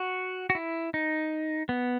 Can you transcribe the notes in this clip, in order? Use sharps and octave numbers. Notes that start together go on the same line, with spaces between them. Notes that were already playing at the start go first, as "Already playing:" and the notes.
Already playing: F#4
F#4
E4
D#4
B3